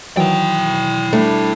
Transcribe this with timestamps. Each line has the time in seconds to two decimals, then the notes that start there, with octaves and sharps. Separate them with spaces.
0.17 D#3 E3 F#3 E4 G5
1.12 G3 A3 D4